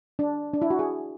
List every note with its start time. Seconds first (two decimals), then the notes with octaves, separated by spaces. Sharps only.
0.19 D4
0.54 D4
0.62 E4
0.70 F#4
0.79 G#4